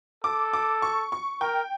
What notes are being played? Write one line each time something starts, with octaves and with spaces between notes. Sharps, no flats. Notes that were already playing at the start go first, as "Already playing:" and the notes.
A4 D6
D6
C#6
C#6
A#4 G5